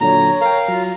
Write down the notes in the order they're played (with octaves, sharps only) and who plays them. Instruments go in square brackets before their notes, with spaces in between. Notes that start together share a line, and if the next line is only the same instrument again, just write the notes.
[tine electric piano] A#2 D3 F#3 [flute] C#5 [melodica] A#5
[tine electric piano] A#4 G5 [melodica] F5 A#5
[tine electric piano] F#3 [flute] F4